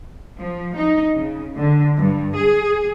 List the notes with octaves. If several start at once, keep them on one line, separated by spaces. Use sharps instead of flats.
F3
D#4
C#3
D3
G2
G#4